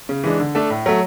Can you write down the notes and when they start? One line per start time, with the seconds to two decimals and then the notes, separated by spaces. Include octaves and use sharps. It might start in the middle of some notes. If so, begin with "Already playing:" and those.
0.09 C#3
0.24 E3 G#3 D4
0.40 D3
0.55 A3 D4 A4
0.70 A2
0.86 F#3 A3